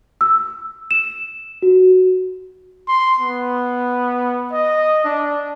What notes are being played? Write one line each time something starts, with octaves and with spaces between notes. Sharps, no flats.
E6
E7
F#4
C6
B3
D#5
D4